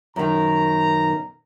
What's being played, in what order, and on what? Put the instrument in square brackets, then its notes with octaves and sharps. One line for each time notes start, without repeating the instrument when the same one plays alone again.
[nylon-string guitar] F#2 D#3 [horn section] B2 A#5